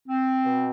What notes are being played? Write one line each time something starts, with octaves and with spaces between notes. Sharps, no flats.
C4
B2